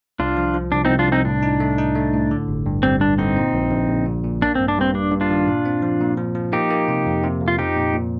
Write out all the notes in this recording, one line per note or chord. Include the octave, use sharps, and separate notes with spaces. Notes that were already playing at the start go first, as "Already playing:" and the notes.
C2 D4 F4
F3
F3
C2 D4
C2 C4 D#4
D4 F4
C2 C4 D#4
A2 D4
D#4
A3
D#4
A3
A2
D3
G1
G2
G3 C4
G2 D4
D3 C4 D#4
A#2
A#1
A#1
A#1
A#2
A#2
A#3 D4
C4
G2
D4
G2 C4
G2 D4
G2
D4 F4
D#3
A#2
C4
F3
A#2
F3
F3
A#3 D#4 G4
A#3
C3
F2
C3
F2
F4
F3 D#4 G4
A#2
A#2